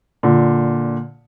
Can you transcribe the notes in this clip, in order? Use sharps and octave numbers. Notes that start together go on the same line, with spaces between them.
A#2 D3